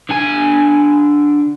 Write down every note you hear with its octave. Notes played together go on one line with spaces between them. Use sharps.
D3 G#5